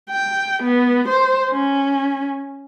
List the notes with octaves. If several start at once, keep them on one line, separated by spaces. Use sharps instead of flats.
G5
B3
C5
C#4